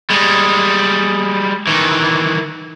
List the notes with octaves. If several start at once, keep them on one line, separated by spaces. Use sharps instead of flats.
G3 G#3
D#3 E3